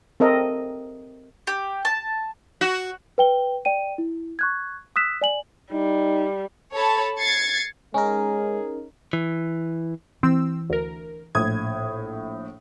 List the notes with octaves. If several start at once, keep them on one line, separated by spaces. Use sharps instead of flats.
C4 A4 A#4 D#5
G4
A5
F#4
B4 G5 G7
D5 G5 D#7
E4
C#6 F#6 G#6
D#6 E6 F#6 B6 E7
D5 G#5 F#7
G3 D#4
A4 C#5 A5 B5
G#6 A6 C7 C#7
G#3 C#4 D#4 G#4 A#4 G#5
E3
E3 C4 E6
D2 A#4
A#1 A2 D#6 G#6